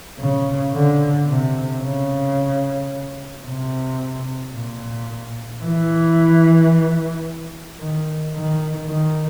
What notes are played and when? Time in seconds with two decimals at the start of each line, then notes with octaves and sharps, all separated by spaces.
0.19 C#3
0.73 D3
1.27 C3
1.82 C#3
3.45 C3
4.54 A#2
5.63 E3
7.80 D#3
8.35 D#3
8.89 D#3